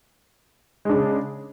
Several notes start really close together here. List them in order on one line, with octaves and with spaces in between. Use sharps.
G#3 D4 C#3